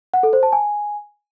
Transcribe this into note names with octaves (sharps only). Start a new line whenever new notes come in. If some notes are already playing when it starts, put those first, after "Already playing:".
F#5
A4
C5
A5
G#5